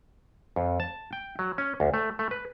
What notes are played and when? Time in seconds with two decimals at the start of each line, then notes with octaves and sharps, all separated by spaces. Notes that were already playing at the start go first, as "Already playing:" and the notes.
0.56 F2
0.80 A5
1.13 G5
1.39 F#3
1.58 C#4
1.80 D2
1.94 A3
2.19 A3
2.31 B4